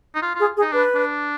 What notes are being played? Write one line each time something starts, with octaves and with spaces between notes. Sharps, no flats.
D#4
F4
F4
G#4
G#4
D#4
D4 B4
D4